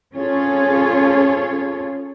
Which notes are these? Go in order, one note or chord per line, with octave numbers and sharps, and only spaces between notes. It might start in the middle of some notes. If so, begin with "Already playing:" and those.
C4 C#4 F4 G#4 A4 C#5